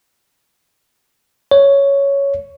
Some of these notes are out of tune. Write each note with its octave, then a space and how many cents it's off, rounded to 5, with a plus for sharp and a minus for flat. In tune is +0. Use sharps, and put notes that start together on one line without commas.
C#5 +5